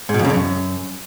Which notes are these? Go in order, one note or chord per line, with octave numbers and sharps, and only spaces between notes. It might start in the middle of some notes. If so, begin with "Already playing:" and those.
G#2
B2
F2
C#3
F#2